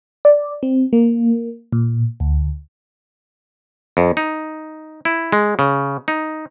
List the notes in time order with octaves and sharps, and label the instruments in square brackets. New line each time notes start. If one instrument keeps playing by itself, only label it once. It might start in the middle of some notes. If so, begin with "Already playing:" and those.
[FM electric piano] D5
C4
A#3
A#2
D2
[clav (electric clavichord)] F2
D#4
E4
G#3
C#3
D#4